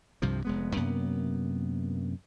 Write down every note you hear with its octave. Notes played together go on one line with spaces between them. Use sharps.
C2 G2 C3 F3
F1 G#3 B3
F#2 C3 A#3 B3